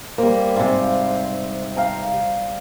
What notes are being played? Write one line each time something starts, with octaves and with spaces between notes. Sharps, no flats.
G3 A#3 C5
G#2 C3 F5
F5 G5 A#5